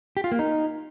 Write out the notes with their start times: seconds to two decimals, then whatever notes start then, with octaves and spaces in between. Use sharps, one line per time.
0.17 G4
0.24 F4
0.32 A#3
0.39 D#4